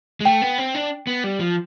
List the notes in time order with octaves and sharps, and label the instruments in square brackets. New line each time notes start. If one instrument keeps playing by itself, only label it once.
[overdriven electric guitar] G#3
[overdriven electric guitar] A3 [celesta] G5
[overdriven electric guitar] B3
C4
D4
B3
G3
F3